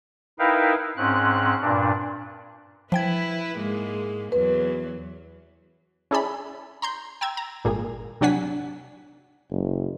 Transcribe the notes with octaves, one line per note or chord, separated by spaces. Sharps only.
D#4 E4 A#4 B4 F5 G5
G#2 C4 C#4 F#6
G2 A#2 D4
F3 E4 B4 G5 G#6
G#2 G#3 A#3
E2 F#3 B4
C#4 E4 G#4 D5 A5 B5
A#5 C6 G6
G5 A#5 E6 G#6
A#5
G#1 A#2 A#3 G#4
C3 F#3 D4 F#5 G#5 B6
F#1